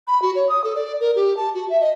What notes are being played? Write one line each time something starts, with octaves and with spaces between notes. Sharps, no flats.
B5
F#4
C#5
D#6
A4
D5
A#4
G4
A5
F#4
E5
D#5